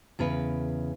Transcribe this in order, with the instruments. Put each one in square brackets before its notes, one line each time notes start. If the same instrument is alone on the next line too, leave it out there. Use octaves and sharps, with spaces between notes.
[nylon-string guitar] E2 C#3 A#4 B4